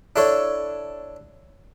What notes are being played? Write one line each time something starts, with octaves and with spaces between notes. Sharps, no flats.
D4 E4 A4 C#5